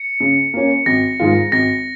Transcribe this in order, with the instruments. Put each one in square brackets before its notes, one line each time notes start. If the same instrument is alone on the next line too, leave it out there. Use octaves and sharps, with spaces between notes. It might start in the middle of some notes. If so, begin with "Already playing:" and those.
Already playing: [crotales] C#7
[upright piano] C#3
A#3 C#4
[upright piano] G#1 [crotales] A#6
[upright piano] G#2 D#3 G#3 F4
[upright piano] G#1 [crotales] A#6